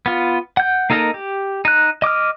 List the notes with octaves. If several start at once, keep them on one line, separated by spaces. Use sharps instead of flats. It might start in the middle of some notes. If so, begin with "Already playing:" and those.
B3 F4
F#5 G6
A#3 D#4 A4 A#4 D#5
G4
D#4 F#6
D#5 D6 D#6 F6